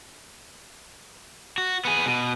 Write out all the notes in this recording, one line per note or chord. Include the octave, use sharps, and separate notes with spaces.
F#4
B3 G#4
B2